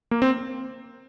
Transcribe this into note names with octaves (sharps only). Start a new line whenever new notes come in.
A#3
C4